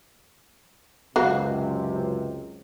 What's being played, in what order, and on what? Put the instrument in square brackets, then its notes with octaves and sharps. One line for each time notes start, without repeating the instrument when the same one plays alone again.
[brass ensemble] C#2 F#2 C3 [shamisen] F#4 F5